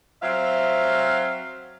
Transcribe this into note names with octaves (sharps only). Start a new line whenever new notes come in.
F#3 C4 E5 F5